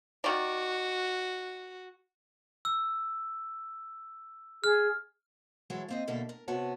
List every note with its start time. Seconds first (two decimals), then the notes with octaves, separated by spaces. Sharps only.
0.24 D#3 F#4 D5
2.65 E6
4.64 G#4 F6
5.70 E3 F#3 G#3 A4 C#5
5.88 A#3 C4 D#5
6.08 B2 D3 A#3 A4 E5
6.29 A#4
6.48 C3 B3 F#4 C#5 A5